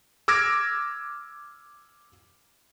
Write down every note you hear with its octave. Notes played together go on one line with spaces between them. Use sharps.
D6 E6 F6 G#6 A#6 D7